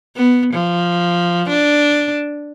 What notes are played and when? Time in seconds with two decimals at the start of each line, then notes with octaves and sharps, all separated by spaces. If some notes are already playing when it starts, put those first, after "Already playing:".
0.16 B3
0.53 F3
1.49 D4